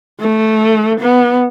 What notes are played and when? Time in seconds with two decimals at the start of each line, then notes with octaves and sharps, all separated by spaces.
0.20 A3
1.00 B3